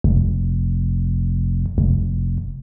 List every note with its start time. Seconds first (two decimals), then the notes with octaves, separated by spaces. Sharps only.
0.04 F1
1.78 F1